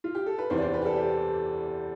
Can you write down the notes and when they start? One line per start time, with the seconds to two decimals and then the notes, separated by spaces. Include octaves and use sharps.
0.04 F4
0.15 G4
0.26 A4
0.38 B4
0.50 E2 C3 E3 C5
0.57 D5
0.62 C5
0.74 B4
0.82 G4
0.86 A4
0.97 G4